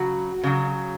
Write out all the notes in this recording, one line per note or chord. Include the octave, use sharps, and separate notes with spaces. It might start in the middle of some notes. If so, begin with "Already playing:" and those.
Already playing: C#3 F#3 F#4
C#3 F#3